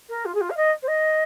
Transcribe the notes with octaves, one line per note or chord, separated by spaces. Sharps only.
A#4
F4
G#4
F4
F5
D#5
C5
D#5